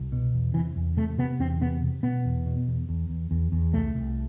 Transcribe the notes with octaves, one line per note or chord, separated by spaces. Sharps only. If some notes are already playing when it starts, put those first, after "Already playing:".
Already playing: C2
B2
E2
C3 E3
E2
C3 A3
C3 B3
E2 C4
C3 B3
C3
B2 B3
E2
B2
E2
E2
E2
E2
E2
C2 A3
C2